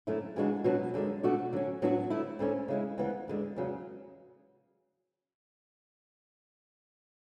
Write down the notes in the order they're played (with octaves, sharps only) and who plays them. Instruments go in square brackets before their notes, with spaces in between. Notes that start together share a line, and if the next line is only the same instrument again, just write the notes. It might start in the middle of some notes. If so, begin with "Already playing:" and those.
[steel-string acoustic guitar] F#2 D3 A3 C#4 E4
C#3 E3 G#3 D4 F#4
B2 F#3 B3 D4 F#4
F#2 D3 G#3 D4
B2 A3 D4 F#4
D3 F#3 C#4
A2 F#3 B3 D4 F#4
D3 A3 E4
D2 D3 A3 C#4
C#3 G#3 C#4 E4
D2 C#3 E3 B3
E2 D3 G#3
E2 C#3 F#3